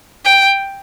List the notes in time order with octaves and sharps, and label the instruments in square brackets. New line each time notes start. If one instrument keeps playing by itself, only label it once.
[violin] G5